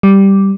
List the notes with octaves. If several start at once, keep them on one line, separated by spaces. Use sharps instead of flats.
G3